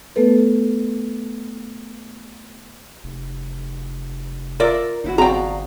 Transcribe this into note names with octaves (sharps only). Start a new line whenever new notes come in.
A3 B3 A4 B4
F1
F4 A#4 D5 E5
G1 D#4 E4 F#4
C4 F#4 G#4 D5 F5 G5 A5 A#5